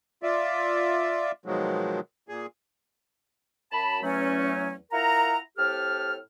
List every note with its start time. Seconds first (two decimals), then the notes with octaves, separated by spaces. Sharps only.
0.23 F4 D5 E5
1.46 B2 D#3 F3 F#3 G#3
2.29 A#2 G#4
3.72 F#2 A5 B5
4.03 E2 F#3 A3 C#4
4.92 E4 F4 A#4 F#5 A#5
5.58 A2 C4 G4 A4 F6